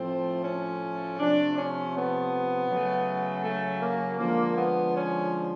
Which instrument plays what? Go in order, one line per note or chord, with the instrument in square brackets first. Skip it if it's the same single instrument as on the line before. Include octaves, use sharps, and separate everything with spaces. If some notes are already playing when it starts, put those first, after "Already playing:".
Already playing: [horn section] A2 F3 A3 C4
C#4
C3 F3 A3 D4
C#4
B3
C#3 F#3 A3
A3
A#3
D3 F3 G#3 A#3
B3
C#4